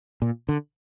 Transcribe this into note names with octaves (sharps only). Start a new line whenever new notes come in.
A#2
D3